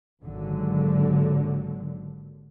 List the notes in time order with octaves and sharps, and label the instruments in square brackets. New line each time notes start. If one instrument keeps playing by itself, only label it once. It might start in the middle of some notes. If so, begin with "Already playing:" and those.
[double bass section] G#1 D#2 D3 F#3